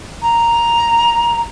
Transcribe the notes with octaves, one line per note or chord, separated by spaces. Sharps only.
A#5